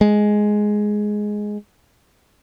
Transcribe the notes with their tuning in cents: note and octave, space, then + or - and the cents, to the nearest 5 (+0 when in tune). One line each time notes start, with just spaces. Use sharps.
G#3 +5